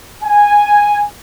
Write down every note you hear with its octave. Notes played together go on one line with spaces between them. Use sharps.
G#5